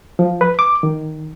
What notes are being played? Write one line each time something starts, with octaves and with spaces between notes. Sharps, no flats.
F3
B4
D6
D#3